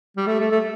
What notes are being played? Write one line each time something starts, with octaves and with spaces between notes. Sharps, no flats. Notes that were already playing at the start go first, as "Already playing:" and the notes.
G3
A3
A3
A3